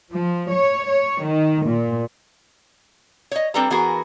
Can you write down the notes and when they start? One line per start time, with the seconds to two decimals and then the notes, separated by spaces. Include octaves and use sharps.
0.14 F3
0.52 C#5
0.87 C#5
1.25 D#3
1.66 A#2
3.32 C#5 D#5
3.54 G3 C4 D4 A4 B4 A#5
3.70 E3 B3 F#4 G#4 A#4